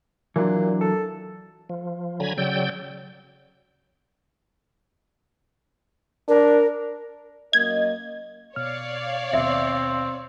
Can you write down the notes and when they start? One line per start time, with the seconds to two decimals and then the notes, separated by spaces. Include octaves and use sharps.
0.36 A#2 E3 F#3 D4
0.81 A4
1.69 F3
2.20 D3 F#3 G#5 A#5 B5 G#6
2.38 C#3 F#3 D5 G5 E6 G6
6.28 D4 A#4
7.53 F#2 A#3 D#5 G#6
8.56 B2 C#5 D5 F5 F6
9.33 D#2 B2 C4 E5